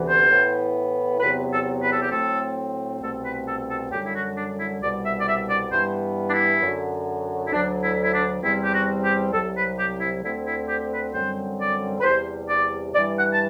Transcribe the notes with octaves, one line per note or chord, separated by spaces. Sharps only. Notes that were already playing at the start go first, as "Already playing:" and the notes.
Already playing: D2 C3 E3 B3
C5
A2 E3 B3
E2 C3 F#3 B3 B4
A4
B4
A4
G4
A2 F#3 A3 C4 A4
C2 B2 A3 C4 A4
B4
A4
A4
F#2 D3 G3 G4
E4
F#4
D4
E4
C2 B2 G3 D5
E5
D5
E5
D5
G2 E3 G3 B3 C5
D4
E4
F#2 D3 F#3
E4
D2 D3 F#3 D4
E4
E4
D4
E2 C3 G3 C4 E4
G4
F#4
G4
C2 C3 F#3 A4
B4
G4
E4
D2 D3 A3 C4 E4
E4
G4
B4
F#2 D3 G3 C4 C5
D5
B4
E2 C3 G3 C5
D5
G2 E3 G3 D5
F#5
A5